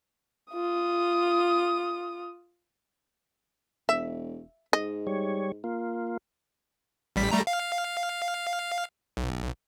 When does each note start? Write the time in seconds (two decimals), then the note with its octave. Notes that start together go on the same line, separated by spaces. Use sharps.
0.53 F4 D#6
3.89 E1 E5
4.73 G#2 D#5
5.07 G3 C#5
5.64 A#3 F4
7.16 A1 G3 B6
7.31 G3 A3 A#5
7.47 F5
9.17 B1